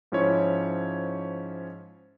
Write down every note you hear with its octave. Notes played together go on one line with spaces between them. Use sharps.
G#2 F3 C#4 E4 C#5